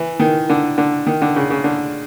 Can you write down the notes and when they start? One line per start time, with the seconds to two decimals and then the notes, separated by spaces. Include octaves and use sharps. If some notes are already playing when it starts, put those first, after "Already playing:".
Already playing: E3
0.19 D#3
0.49 D3
0.78 D3
1.06 D#3
1.22 D3
1.36 C#3
1.50 C#3
1.64 D3